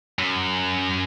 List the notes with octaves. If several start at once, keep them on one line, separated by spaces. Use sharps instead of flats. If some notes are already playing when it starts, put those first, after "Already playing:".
F#2